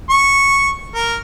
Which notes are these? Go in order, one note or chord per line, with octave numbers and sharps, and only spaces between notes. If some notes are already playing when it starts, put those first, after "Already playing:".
C#6
A#4